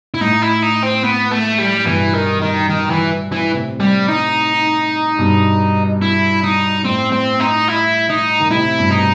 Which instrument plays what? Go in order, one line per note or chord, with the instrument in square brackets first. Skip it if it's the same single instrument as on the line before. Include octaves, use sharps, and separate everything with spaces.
[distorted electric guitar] E4
[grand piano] A2 [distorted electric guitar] D#4
[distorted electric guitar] E4
D#4
C4
B3
A3
G3
[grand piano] A2
[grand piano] G2 B2 [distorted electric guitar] E3
[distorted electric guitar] D#3
D#3
D#3
E3
E3
[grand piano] A2 C3
[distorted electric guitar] G3
D#4
[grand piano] G2 B2
[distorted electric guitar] E4
D#4
[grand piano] A2 [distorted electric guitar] C4
[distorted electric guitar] C4
D#4
E4
D#4
[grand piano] D#3
[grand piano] A2 C3 [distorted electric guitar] E4
[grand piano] G2 B2
[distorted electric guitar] D#4